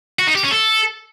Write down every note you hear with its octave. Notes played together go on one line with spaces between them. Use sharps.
F#4
D#4
G4
C#4
A4